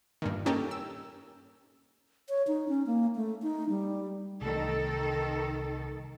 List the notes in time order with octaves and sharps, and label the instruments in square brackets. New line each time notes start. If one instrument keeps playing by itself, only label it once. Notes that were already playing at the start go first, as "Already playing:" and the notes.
[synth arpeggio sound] G2 A#2 D#3
A#3 C#4 D#4 G4 A4 A#4
E6
[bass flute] C#5
D#4
C#4
A#3
A3
D#4
G3
[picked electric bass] C2 A3 [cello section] D#3 A4